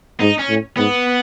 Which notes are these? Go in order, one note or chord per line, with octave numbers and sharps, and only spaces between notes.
G#2 D#4
C#4
A2
G#2 B3